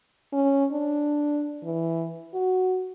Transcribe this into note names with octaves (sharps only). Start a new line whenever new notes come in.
C#4
D4
E3
F#4